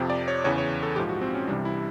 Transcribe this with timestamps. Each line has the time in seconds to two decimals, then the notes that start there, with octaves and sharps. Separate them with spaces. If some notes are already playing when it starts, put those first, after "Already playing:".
Already playing: F2 C3 F3
0.10 D5
0.28 C#5
0.44 E2 C#3 E3 C#5
0.58 C#5
0.83 A4
0.96 A#1 G#2 F3 G4
1.09 F#4
1.21 C4
1.34 C#4
1.47 C2 C3 E3 G3 D4
1.65 E4